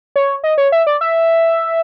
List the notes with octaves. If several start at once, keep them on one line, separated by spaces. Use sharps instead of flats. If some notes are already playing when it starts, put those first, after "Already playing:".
C#5
D#5
C#5
E5
D5
E5